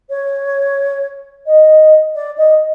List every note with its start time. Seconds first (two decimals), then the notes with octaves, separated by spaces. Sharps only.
0.09 C#5
1.46 D#5
2.14 D5
2.37 D#5